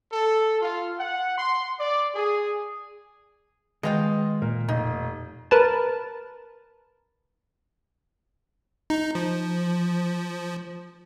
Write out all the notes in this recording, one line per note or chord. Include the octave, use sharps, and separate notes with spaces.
A4
F4
F#5
C6
D5
G#4
B2 D#3 G#3 F4 D#5 G5
A#2 A#4
F1 B2 D#4
A#4 B4 A5
D#4
F3